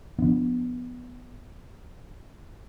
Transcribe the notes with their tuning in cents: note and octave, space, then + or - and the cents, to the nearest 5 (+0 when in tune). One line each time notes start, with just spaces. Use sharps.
F3 +0 B3 +0 D4 +0